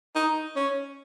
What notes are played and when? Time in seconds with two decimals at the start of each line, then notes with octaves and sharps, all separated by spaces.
0.15 D#4
0.56 C#4